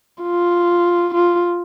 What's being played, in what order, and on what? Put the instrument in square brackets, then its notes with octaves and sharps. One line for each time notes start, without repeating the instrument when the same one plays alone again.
[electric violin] F4
F4